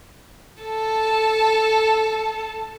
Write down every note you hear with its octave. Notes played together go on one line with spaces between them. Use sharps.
A4 A5